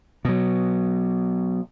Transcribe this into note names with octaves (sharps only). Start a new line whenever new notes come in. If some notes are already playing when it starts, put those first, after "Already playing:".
B2 F#3